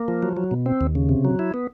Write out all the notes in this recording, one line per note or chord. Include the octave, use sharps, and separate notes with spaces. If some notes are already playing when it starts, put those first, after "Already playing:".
Already playing: A#3
F3
F#3
F#3
B2
C4
D#2
C#3
C3
F#3
E4
B3